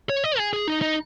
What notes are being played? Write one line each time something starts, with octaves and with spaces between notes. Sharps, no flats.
C#5
D#5
G#4
G#4
D#4
D#4